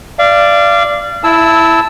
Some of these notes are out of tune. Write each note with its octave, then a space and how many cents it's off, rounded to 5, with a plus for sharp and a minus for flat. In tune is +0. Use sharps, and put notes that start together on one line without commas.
D5 +0 F5 -30
E4 +0 A5 +0 E6 -15